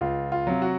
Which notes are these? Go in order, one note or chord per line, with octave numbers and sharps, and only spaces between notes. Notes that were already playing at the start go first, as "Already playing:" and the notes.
C#2 F4
F4
C3 F#3
F#4